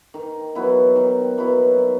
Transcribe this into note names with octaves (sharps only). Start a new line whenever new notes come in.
D#3
F#3 B3 E4
D#3
F#3 B3 E4
D#3